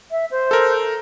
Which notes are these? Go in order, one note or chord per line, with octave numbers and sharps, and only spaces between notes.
E5
C5
A4 A#4